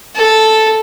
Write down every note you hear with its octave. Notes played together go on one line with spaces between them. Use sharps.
A4